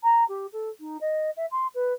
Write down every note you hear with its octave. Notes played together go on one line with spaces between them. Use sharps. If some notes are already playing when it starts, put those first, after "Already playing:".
A#5
G4
A4
D#4
D#5
E5
C6
B4